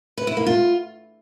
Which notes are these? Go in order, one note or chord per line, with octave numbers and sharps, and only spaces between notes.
B4
E4
A#3
F4